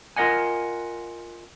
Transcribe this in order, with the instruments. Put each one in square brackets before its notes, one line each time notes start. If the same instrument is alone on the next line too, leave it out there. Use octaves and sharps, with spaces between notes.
[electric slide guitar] F4 A#4 D#5 F#5 G#5